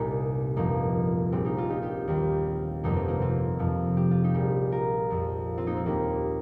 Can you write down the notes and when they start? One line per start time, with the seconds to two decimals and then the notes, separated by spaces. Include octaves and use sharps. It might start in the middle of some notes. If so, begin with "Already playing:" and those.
Already playing: G1 C2 A#2 G3 A#3 C4 D#4
0.56 G1 F2 F3 A#3 D#4
1.32 A#1 A#2 G3 C4
1.45 A#3 D#4
1.57 C4 F4
1.70 D#4 G4
1.82 D#4 G4
2.08 D#2 D#3 G3
2.83 G1 F2 C3 A#3 D#4
2.96 C4 F4
3.08 A#3 D#4
3.22 C4 F4
3.59 F2 C3 F3
3.97 G4
4.11 F4
4.24 D#4 G4
4.34 A#1 A#2 G3
4.72 F4 A#4
5.10 F2 F3
5.58 C4 F4
5.66 A#3 D#4
5.77 C4
5.86 D#2 D#3 G3 A#3 D#4